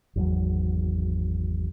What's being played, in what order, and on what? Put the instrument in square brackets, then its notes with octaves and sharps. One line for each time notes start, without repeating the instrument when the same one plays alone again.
[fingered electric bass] G#1 E2 F#3